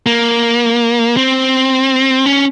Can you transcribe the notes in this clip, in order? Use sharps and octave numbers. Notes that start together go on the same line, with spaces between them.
A#3
C4
C#4